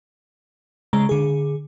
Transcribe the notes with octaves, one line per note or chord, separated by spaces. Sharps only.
C#3 G#3 A#5
D3 G#4